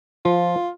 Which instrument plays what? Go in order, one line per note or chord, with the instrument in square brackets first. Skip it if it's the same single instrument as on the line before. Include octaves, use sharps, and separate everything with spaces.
[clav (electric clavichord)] F3 [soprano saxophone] F4